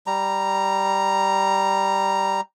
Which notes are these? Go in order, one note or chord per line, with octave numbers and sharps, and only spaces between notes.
G3 A#5